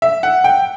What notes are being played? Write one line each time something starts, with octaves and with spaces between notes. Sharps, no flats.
E5
F#5
G5